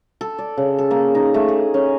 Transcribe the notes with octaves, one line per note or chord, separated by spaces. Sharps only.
A4
D5
C#3
A4
A#3
D#4
A3
G#4
C#4